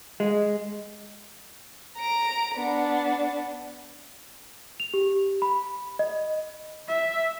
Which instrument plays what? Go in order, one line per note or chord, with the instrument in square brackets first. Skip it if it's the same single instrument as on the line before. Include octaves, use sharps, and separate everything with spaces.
[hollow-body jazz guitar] G#3
[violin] A#5 D7
B3 D4
[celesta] F7
G4
B5
D#5
[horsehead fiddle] E5